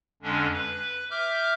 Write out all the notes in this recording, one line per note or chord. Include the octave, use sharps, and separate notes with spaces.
F2 D3 G#3 C#4 D4
B4
E5 D6 F6 G6